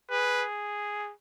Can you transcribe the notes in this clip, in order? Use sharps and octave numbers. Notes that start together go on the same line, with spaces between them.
G#4 B4